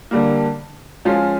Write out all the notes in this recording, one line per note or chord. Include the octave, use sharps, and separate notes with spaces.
D3 G3 A#3
F3 G#3 C#4 F4